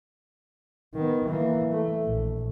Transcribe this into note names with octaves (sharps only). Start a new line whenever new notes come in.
D#3 B3
E3 A#3
A3
A#1